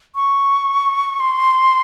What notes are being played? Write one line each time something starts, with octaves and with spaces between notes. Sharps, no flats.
C#6
C6